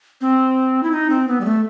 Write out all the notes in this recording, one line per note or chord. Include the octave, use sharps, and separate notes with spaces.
C4
E4
D#4
C4
B3
G3
A3